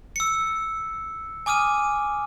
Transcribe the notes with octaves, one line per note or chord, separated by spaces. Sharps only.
E6 C#7
G#5 D6 D#6 F6 D#7